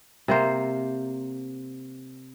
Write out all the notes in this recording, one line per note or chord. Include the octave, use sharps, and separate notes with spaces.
C3 A#3 C5